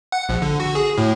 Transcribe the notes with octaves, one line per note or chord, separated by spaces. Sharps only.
F#5
A#1
D3
F#4
G#4
A2